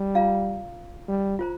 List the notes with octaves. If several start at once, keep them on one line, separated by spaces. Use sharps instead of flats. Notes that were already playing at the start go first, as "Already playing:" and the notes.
Already playing: G3
F4 D5 F5 A#5
G3
F4 C5 A#5